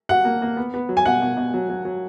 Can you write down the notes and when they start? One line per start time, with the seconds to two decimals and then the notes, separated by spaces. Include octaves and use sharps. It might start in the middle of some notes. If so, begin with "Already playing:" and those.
0.09 F#4 F#5
0.25 A#3
0.42 A#3
0.57 B3
0.74 B3
0.89 F#3
0.97 G#5
1.06 B2 F#5
1.22 B2
1.37 B2
1.54 F#3
1.70 F#3
1.85 F#3